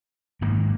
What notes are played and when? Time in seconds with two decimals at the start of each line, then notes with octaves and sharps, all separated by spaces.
0.41 G#2 D#3 A#3